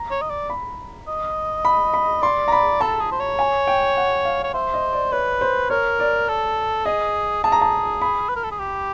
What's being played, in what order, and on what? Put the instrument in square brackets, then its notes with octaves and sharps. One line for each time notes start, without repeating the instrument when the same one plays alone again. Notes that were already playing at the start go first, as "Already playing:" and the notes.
Already playing: [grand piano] A#5
[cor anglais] C#5
D#5
D5
[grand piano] B5
[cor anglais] D#5
[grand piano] B5
B5
[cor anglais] D5 [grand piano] C6
[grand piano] A#5
B5
[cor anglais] A4 [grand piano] A5
[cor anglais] G#4
C5
C#5
[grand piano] G#5
G5
F#5
F5
[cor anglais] C#5
[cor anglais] C5 [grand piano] E5
[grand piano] D#5
D5
[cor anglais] B4 [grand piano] C#5
[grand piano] C5
[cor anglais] A#4 [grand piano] C#5
[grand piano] D5
[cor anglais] A4
[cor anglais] G#4 [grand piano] D#5
[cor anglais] G#4 [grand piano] A5
[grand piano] A#5
A5
B5
[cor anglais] B4
A#4
A4
G#4
G4